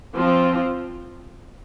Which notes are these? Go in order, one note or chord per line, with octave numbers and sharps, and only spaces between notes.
F3 C4 F4